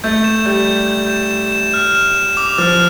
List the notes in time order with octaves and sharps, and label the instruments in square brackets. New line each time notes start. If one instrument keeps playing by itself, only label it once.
[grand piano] A3 [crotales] G6
[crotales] E7
[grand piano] G3 [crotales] G6
[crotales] G6
G6
E7
E7
E7
F6
E7
E7
D6
[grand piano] F3 [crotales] F6